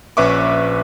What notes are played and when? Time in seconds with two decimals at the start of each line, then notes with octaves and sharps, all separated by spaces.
0.17 A#1 C#4 B4 E5 C#6 D6